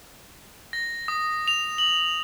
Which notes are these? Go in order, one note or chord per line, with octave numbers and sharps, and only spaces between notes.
A#6
D#6
F7
F#7